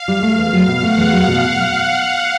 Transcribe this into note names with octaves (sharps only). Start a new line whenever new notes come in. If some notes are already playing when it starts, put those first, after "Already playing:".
Already playing: F5
G3
A3
E2
F#3
B2
A3 F#5
E2
F#3 F5
B2